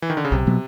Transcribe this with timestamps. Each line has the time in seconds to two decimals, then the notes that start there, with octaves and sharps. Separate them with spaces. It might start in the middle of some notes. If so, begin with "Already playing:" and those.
0.02 E3
0.10 D#3
0.17 D3
0.25 C#3
0.32 B1 C3
0.47 B2 F#3 B3